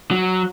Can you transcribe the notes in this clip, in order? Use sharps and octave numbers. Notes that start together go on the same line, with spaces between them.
F#3